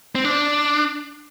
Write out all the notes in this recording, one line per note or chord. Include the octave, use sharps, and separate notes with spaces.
C4
D4